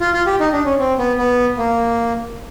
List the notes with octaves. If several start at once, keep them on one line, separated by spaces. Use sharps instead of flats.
F4
F4
G4
D#4
D4
C#4
C4
B3
B3
A#3